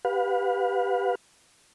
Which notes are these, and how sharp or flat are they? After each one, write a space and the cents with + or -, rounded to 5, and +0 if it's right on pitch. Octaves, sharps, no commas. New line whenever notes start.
G4 +0 B4 +0 F5 +45